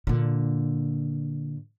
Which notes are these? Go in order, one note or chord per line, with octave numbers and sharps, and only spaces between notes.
A#2 D3